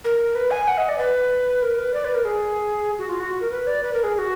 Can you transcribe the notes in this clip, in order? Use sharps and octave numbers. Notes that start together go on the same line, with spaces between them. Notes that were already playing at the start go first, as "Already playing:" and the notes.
A#4
B4
G#5
F#5
D#5
D5
B4
A#4
B4
D5
B4
A#4
G#4
F#4
F4
F#4
A#4
B4
D5
B4
A#4
G#4
G#4
F#4